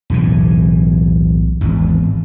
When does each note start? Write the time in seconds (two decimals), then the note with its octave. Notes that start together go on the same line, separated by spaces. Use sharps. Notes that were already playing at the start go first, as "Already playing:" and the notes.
0.10 B1 E2 A2 E3
1.61 G#1 E2